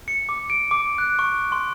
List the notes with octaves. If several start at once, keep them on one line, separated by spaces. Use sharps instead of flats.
C#7
D6
D7
D6
F#6
C#6
C6